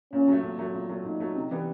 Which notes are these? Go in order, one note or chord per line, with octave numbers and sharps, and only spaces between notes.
A#2 C#4
F#3 A3
A#2
F#3 A3
A#2
F#3 A3
A#2 D#4
F#3 A3
C3
E3 G3 B3